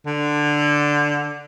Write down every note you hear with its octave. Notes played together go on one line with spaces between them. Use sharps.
D3